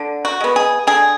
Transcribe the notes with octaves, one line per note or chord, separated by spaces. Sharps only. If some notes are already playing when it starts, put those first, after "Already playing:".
Already playing: D3
F#4
G#3 B3
G#4
D3 G#4